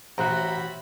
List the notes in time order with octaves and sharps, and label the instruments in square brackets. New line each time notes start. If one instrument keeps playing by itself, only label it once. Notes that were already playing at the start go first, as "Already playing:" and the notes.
[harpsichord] A1 [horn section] F#4 B5 [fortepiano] C5 E5 F#5 [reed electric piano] A#5 F#6